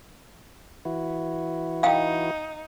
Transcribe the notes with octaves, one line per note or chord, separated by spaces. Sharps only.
E3 E4 F#4
D#4 F5 G5